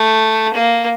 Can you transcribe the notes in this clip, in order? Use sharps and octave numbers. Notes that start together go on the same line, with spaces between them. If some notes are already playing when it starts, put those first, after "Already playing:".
Already playing: A3
A#3